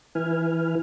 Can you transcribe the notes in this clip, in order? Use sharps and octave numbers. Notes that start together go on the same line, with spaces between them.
E3 E4 B4 G#5 F6